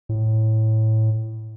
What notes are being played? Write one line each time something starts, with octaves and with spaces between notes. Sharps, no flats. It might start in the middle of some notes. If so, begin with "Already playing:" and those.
A2